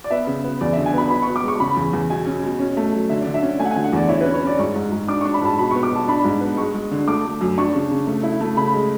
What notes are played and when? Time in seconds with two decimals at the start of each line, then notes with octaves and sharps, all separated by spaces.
0.04 D5
0.11 B3 E5
0.27 C#3
0.44 B3
0.61 E2 D5
0.73 E5
0.77 D3
0.86 G#5
0.94 B3 B5
1.10 B3 B5
1.22 C#6
1.27 B3
1.36 D6
1.43 G#3 C#6
1.60 C#3 B5
1.76 E2
1.93 E2
2.10 B2 G#5
2.26 C#4
2.43 B2
2.60 C#4
2.77 A3
2.93 F#3
3.10 D3 E5
3.22 D5
3.27 D3
3.34 E5
3.42 C#4
3.59 A3 G#5
3.65 F#5
3.71 G#5
3.76 D3
3.84 F#5
3.92 E2 D5
4.09 E4 C#5
4.21 B4
4.26 C#4
4.34 C#5
4.42 C#4
4.47 D5
4.59 G#2 C#6
4.76 G#2
4.92 G#2
5.08 D4 D6
5.21 C#6
5.25 D4
5.34 B5
5.42 G#2 A5
5.58 B2 B5
5.71 C#6
5.75 B3
5.83 D6
5.91 B2 A5
6.08 D4 B5
6.24 G#2
6.41 B3
6.57 G#3 C#6
6.74 G#3
6.91 D3
7.07 A3 D6
7.25 A3
7.41 F#2
7.58 D4 C#6
7.74 C#3
7.91 C#3
8.07 A3
8.23 E4
8.41 A3
8.57 C#3 B5
8.74 G#3